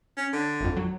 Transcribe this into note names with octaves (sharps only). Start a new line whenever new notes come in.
C#4
D3
G#1 F2
F#3